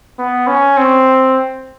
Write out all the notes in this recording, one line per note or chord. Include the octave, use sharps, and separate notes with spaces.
B3
C#4
C4